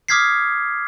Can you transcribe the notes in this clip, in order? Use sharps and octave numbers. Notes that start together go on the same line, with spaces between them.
D6 D#6 F6 G#6 B6 C7